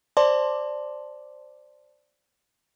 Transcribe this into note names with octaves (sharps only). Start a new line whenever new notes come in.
C5 D5 A5 C6 D6